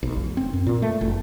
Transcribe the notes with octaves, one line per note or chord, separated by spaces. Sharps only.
B1
F1
C4
F#2
A#2
A3
F#1